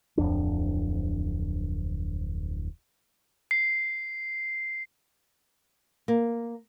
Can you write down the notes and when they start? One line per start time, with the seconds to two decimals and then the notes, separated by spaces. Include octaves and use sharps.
0.17 D1 F2 D4
3.51 C7
6.08 A#3